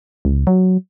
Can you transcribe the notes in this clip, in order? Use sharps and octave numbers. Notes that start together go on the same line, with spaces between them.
C#2
F#3